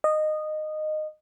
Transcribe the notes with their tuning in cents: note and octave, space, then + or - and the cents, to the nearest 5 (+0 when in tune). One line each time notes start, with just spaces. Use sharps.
D#5 -15